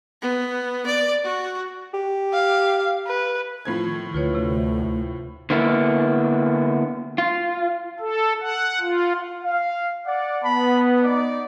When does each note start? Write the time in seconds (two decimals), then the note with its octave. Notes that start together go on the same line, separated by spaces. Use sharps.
0.22 B3
0.86 D5
1.24 F#4
1.94 G4
2.33 F5
3.07 B4
3.65 A2 F3 G#6
3.86 D#3
4.14 D2 A3 F4 B4 C#5
4.35 C3 A3
5.50 D3 A#3 B3 E4
7.18 F4
8.00 A4
8.41 F#5
8.80 F4
9.44 F5
10.06 D5 F#5
10.44 B3 A5 B5
11.03 D#4 D5